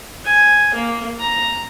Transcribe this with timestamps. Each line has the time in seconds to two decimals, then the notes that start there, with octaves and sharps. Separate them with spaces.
0.25 G#5
0.74 A#3
1.19 A#5